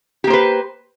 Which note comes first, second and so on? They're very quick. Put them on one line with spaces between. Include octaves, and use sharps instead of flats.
G4 A#3 C5 B4